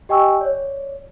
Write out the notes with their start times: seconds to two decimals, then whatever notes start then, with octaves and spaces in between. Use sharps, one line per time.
0.09 G4 D#5 G5 G#5 C#6 E6
0.41 C#5 D5